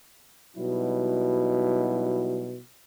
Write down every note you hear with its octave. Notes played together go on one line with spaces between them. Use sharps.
B2 F#3 G3 D#4 E4